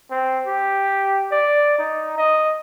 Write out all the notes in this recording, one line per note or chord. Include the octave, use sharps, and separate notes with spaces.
C4
G4
D5
D#4
D#5